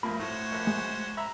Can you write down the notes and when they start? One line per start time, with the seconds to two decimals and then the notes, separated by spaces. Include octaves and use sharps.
0.03 G2 F3 A3 A#3 B5
0.20 A2 F#4 C5 C#5
0.52 A#1
0.67 G#3
1.17 E5 A#5 B5